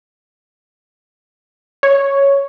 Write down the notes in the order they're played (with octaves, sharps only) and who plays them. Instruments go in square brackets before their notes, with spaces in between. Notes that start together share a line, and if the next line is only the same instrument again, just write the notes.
[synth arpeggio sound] C#5